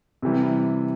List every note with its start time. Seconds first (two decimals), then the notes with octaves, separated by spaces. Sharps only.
0.22 C3 E3 G3